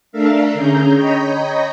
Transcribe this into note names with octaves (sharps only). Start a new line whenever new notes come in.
A3 D4 A4 A#4 E5 F5
D3 C#4 G#4 A#5 G6
C#5 D#5 G5 A#5 B5